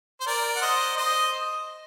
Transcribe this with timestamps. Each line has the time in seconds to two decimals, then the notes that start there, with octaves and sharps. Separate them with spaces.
0.21 C5
0.27 A#4 D5
0.56 F#5
0.62 C5 D#5
0.97 C5 D#5